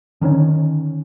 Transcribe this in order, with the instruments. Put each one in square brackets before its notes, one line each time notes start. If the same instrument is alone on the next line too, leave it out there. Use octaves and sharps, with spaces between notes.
[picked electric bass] D3 D#3 B3 C#4